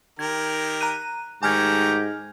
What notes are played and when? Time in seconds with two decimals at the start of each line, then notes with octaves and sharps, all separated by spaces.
0.19 D#3 G4 A#4 G#6
0.81 A#5 F#6 D#7
1.43 G#2 D#3 A3 G4 G#5 A#5 F6 G#6